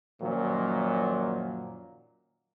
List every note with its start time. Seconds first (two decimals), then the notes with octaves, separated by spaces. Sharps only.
0.22 F#2 A#2 D#3 F3 F#3 A#3